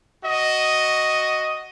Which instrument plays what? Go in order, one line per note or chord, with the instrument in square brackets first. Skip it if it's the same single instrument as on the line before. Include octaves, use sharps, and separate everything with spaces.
[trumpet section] F#4 D#5